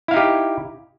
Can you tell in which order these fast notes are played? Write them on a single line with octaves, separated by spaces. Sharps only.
E4 F5 D#4 G4